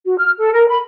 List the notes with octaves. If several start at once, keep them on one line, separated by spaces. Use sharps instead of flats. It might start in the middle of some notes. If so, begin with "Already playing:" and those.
F#4
F6
A4
A#4
B5